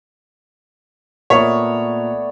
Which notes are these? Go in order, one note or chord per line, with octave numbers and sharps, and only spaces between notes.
A#2 A3 B3 A#4 C#5 D5 B6